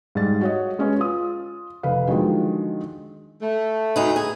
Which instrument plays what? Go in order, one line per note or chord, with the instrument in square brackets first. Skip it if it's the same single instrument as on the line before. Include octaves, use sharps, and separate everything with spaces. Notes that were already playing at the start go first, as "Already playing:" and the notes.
[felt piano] G#2 G3 A6
F#4 C#5 D#5
G#3 C#4 B4 C#5
F4 D#6
F1 B4 F5
D3 D#3 F3 F#3 G#3
[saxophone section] A3
[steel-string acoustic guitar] D2 D#4 B4
G#4